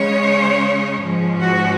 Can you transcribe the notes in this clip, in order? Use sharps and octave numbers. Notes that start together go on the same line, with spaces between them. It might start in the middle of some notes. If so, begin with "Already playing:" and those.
Already playing: C#3 G#3 C#4 C#5
G#2 F3 G#3 C#4
F#4